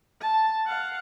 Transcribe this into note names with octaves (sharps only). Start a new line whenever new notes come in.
A5
F5 F#5